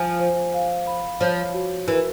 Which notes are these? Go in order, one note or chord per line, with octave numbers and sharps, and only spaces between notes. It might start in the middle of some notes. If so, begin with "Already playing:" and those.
Already playing: F3 G#5
C5
F5
B5
F3 C#5
F#4
E3 A#4